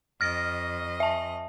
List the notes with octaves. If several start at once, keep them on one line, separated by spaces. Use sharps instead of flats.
F2 D#5 F6 A#6
E5 A5